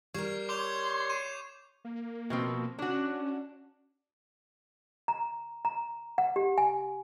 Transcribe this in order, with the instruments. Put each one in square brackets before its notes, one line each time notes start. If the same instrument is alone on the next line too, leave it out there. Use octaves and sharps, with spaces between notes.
[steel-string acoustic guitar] G3 A#4 [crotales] C#6 G#6 C7
[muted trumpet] C#5 [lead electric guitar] C6 [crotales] D6 G6 F7
[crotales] D#7 E7
[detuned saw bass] A#3
[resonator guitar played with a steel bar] B2 F3 C4
[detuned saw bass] C#4 [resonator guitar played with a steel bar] D4 F#4
[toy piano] A#5
A#5
F#5
G4
G#5